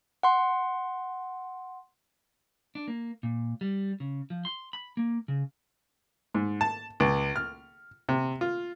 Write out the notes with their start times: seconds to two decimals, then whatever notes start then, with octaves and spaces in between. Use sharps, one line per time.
0.23 F#5 C6
2.75 D4
2.88 A#3
3.23 A#2
3.61 G3
4.00 C#3
4.30 F3
4.45 C6
4.73 B5
4.97 A#3
5.28 C#3
6.34 G#2
6.61 A5
7.00 C#2
7.36 F6
8.09 C3
8.41 F4